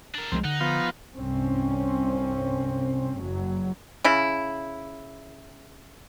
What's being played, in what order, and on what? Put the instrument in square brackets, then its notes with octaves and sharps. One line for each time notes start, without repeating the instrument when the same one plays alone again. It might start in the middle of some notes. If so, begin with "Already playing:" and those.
[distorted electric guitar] D4 A#4
[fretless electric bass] C2 F3 G#3 [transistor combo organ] C4
[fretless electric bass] D3 [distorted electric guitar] D#4 [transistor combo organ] F#5
[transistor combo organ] F3 B3 F4
[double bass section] C2 G2 C4 C#4
F#1 F#3
[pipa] C#3 E4